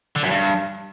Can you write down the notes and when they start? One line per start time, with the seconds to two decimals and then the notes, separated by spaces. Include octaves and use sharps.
0.16 D3
0.23 F#2
0.30 G2